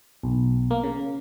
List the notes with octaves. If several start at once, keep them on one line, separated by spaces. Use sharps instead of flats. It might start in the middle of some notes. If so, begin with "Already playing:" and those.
B1
A#3
C#3